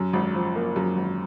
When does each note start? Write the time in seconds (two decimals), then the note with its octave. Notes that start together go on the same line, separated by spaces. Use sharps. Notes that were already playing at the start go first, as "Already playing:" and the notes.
Already playing: F#2
0.13 G#1
0.35 F3
0.56 A#3
0.76 F#2
0.97 G#1